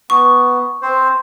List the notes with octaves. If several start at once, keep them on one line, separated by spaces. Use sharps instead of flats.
B3 C#6
C4 C5